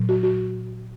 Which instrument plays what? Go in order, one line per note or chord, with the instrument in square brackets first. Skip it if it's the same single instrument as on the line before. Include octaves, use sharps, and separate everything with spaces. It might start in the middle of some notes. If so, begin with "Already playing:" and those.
Already playing: [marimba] A#2 F#3
F#4
F#4